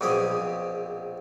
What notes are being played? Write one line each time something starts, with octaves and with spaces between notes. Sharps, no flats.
A#1 B2 C4 G4 G#4 D#6